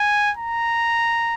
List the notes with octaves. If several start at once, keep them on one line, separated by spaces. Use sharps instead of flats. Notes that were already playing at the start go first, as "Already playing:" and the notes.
Already playing: G#5
A#5